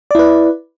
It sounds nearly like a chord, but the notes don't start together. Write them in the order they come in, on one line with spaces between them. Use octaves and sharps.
D5 E4 B4